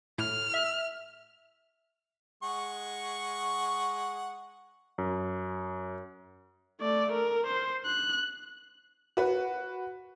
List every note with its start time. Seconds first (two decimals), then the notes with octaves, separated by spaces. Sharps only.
0.18 A2 F6
0.54 E5
2.43 G#3 F#5 C#6
4.98 F#2
6.81 A3 D5
7.12 A#4
7.46 C5
7.85 F#6
9.17 F#4 B4